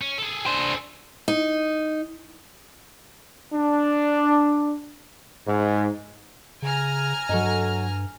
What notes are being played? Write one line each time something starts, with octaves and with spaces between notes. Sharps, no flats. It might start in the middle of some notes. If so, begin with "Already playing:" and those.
C#4
G#4 A4
D4 C5
D#4
D4
G#2
C#3 G#5 A#5 F6
G2 F#3 A4 D#5